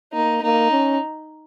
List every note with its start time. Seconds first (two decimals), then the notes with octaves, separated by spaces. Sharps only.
0.13 A#3 D#4
0.43 A#3 D#4
0.72 C#4